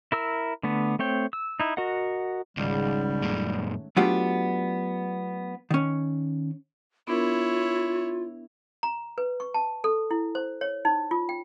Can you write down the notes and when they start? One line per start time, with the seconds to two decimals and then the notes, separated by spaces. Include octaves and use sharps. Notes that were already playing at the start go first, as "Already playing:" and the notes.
0.12 E4 A#4 E6
0.63 D3 A3 B3
0.99 A3 C4 C#5 G5
1.33 E6
1.60 D#4 E4
1.77 F#4 A#4 D#5 F#5
2.57 G#1 C#2 G3 F#5 D#7
3.22 F#2 A#2 A3 C#4
3.97 F#3 A3 B3 D4 F4 G4
5.71 D#3 C#4
7.07 B3 D4 E4 F4 A#4 C#5
8.83 A#5
9.18 B4
9.40 C#6
9.54 A5
9.84 A4
10.11 E4
10.35 C5
10.61 C#5
10.85 D#4
11.11 F4
11.29 G5